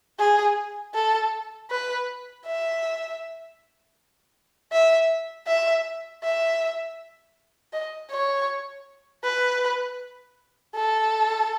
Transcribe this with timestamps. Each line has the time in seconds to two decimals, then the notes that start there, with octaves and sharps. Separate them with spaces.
0.19 G#4
0.95 A4
1.70 B4
2.46 E5
4.72 E5
5.47 E5
6.23 E5
7.73 D#5
8.11 C#5
9.24 B4
10.75 A4